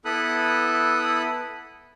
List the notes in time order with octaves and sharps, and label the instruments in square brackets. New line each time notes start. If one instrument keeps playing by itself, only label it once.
[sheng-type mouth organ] B3 E4 A4 B5 D#6 F#6